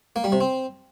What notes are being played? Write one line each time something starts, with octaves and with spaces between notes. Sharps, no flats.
A#3
G3
C3
C4